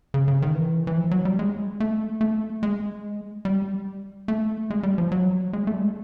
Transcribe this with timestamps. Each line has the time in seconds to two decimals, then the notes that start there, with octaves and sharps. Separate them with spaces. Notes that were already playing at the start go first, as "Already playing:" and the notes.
0.14 C#3
0.28 C#3
0.42 D#3
0.55 E3
0.87 E3
0.97 F3
1.11 F#3
1.25 G3
1.39 G#3
1.80 A3
2.21 A3
2.63 G#3
3.45 G3
4.28 A3
4.70 G#3
4.83 G3
4.98 F3
5.12 F#3
5.53 G#3
5.67 A3
5.74 G3
5.81 G#3